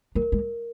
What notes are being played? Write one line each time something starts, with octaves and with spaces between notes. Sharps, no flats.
F#3 A#4
G#3